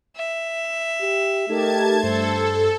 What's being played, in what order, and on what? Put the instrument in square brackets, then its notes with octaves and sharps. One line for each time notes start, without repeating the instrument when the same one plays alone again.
[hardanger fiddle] E5
[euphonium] G4
[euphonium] A3 [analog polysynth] D#4 G4 A#4 [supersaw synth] A5 G#6
[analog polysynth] G2 [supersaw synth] A4 [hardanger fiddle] C5